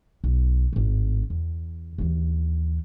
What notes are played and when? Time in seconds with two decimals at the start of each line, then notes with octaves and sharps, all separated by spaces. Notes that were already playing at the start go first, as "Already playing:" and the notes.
0.24 B1
0.73 G#1 A2
1.30 E2
1.98 D#2 E3